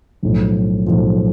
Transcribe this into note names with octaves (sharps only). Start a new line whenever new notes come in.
B1 A2 F3
B1 A2 F3